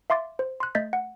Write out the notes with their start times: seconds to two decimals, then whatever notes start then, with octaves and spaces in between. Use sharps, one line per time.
0.10 E5 F5 C6 D6 A6
0.39 C5
0.60 C6 F#6
0.75 A3 D#5 G6 A6 B6
0.93 F#5